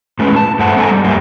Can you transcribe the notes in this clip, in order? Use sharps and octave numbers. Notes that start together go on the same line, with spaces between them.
A2 G#3 C#4 B4
A5
G2 A3 C5 F#5 A5
B3 A4 D#5 G#5 A#5
G3
F#2 A3 A#3 G4